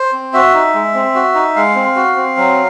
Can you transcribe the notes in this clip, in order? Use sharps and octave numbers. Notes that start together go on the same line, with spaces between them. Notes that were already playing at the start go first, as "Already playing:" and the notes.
Already playing: C5
C4
F#4 E5
D#4
G#3
C4
F#4
D#4
G#3 F5
C4
F#4
C4
F#3